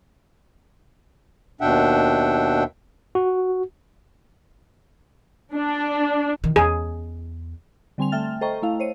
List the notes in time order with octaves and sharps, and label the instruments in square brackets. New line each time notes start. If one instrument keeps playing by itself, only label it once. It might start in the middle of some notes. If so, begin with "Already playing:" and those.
[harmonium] D#2 B2 D4 E5 F#5 G5
[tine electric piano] F#4
[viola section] D4
[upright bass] D#3 E3
[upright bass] E2 [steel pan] G#4
[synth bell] D3 G3 C4 G#5 C6 F7
A3 E5 G5 F6 A6
A4 C5 D#5 G5 A#5 C#6
A3 E4 F5
C5 C#5 D#7